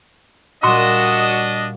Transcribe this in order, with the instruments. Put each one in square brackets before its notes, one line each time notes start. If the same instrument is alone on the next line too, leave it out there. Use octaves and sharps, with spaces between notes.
[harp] A#2 G3 [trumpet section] D4 D#5 [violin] F#4 E6 [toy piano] C6 D6